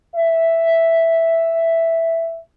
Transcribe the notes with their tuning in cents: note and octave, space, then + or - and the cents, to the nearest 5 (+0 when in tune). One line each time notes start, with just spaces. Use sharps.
E5 +0